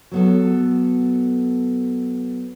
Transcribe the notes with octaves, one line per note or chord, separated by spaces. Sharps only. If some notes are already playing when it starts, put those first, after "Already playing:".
F#3 B3 A4